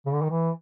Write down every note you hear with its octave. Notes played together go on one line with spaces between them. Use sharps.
C#3
D3
D#3
E3